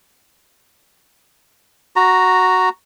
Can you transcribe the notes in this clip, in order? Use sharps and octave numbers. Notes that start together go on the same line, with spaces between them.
F#4 A#5